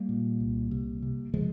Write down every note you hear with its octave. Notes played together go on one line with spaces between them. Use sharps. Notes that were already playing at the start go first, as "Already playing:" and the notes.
Already playing: G3 A#3
A#2
C2
C3
C3
C#3 F3 G#3